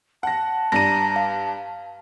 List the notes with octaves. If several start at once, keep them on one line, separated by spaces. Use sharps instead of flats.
F#5 A5 A#6
G2 D4 A#5 A#6 D#7
F5